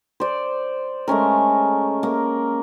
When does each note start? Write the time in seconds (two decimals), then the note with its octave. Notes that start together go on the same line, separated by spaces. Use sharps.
0.20 C5 D5
1.08 G#3 A3 C#4 A#4
2.03 A#3